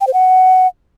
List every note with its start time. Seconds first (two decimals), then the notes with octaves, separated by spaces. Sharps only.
0.01 G5
0.07 C5
0.13 F#5